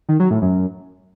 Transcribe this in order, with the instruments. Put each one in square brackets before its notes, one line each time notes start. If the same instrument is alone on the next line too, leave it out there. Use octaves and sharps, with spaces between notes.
[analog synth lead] D#3
F#3
A2
F#2